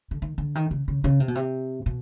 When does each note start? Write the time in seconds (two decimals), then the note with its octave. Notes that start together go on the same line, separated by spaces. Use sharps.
0.11 D3
0.22 D#3
0.38 D3
0.55 D#3
0.71 C#3
0.88 C#3
1.04 C#3
1.20 C3
1.28 B2
1.35 C3
1.86 B2